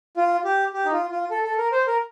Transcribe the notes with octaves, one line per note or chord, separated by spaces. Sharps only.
F4
G4
G4
D#4
F4
F4
A4
A4
A#4
C5
A#4